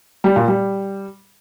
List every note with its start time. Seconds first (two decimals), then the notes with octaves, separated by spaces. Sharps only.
0.24 G3
0.36 A#2
0.48 G3